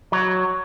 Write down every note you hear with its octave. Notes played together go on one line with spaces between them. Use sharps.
F#3